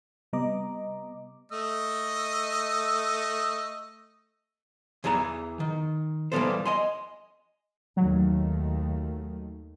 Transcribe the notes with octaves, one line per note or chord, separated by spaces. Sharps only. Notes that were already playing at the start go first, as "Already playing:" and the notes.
C3 G3 B3 D#5 A#5 D6
A3 D#5 E6
E2 E3 G#4 A#4 A#5
D#3
E3 G3 A#3 B3 A4 C5
D#5 G#5 C6
D#2 D#3 F#3 A3